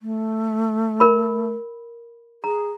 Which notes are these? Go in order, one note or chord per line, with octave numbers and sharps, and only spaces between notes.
A3
A#4 B5
G#4 A#5